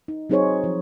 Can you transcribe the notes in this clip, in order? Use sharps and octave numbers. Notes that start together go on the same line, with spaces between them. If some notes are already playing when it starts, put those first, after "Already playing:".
D#4
F#3 C4 D#4 G#4 C5 C#5
F3